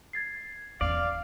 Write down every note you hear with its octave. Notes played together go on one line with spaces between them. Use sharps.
G#6 A6 C7
E2 C#4 D5 F5